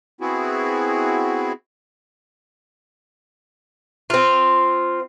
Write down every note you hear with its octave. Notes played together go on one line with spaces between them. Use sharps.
B3 C4 E4 F#4 G#4
C4 F4